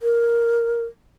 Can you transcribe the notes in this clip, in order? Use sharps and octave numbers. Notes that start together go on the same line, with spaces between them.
A#4